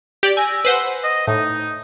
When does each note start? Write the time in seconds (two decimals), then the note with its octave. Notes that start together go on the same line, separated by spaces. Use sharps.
0.23 G4 D5
0.37 G#5 E6 A#6
0.65 B4 C5 F#5
1.04 D#5
1.27 A2 D#4